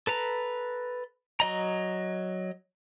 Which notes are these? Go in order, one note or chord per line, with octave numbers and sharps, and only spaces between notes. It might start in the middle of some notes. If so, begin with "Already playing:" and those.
A4 B4 A#5
F#3 D#5 A#5